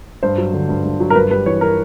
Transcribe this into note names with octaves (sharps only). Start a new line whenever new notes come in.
G2 C5
F#3
D3
G2
G2
F#3
A#4
G2 B4
G3 B4
E3 C#5
A#4